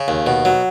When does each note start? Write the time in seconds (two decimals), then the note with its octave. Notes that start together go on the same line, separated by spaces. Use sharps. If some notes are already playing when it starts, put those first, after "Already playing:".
Already playing: C#3
0.08 D#2
0.27 B2
0.45 F#3